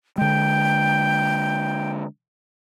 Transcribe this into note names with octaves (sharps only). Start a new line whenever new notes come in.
D3 G#3 G5